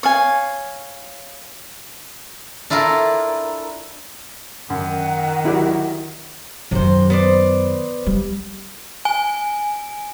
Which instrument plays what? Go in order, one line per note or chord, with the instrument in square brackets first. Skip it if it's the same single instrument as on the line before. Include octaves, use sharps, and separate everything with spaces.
[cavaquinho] C#5 F5 G#5
[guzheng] D4 E4 F4 A4 A#4
[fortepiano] F#2 [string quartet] D#3 [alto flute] F#5
[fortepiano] F#3 G4 [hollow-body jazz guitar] E4 D5
[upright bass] F#2 D#3 [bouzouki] C3 C5
[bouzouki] B3 C5 D5
[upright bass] G3
[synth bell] G#5